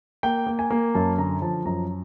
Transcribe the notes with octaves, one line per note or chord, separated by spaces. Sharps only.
A#3 G5
A#3
G#5
A#3
F#2 A5
D3 A#5
F3 A5
F#2 A#5